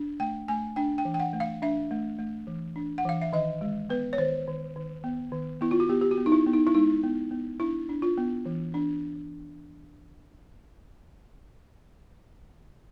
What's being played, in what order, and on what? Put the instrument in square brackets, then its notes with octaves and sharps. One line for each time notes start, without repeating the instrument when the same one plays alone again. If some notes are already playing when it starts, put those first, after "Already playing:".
Already playing: [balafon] D4
A3 G5
A3 G#5
D4 G5
G5
E3
G5
F#5
A3
F5
D4 E5
A3
A3
E3
D4
F#5
E3 F5
E5
D#3 D#5
G#3
B3 B4
C#5
D#3 C5
D#3
D#3
B3
D#3
B3 E4
F4
F#4
B3 G4
G4
F#4
B3
D#4
E4
B3
D#4
E4
G#3 D#4
B3
B3
D4 E4
D4
F4
B3
E3
D4